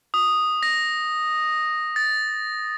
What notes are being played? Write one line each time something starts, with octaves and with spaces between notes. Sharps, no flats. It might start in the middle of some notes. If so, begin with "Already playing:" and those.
D#6
A#6
A6